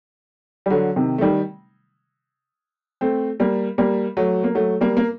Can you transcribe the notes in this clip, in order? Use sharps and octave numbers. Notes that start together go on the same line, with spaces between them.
G3
D3 F#3
C3 D#3
A3
D#3 G3
A3 C4
G3 A#3
G3 A#3
F#3 A3
A#3
F#3 A3
G3 A#3
A#3